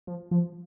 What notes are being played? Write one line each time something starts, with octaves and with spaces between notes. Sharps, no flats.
F3
F3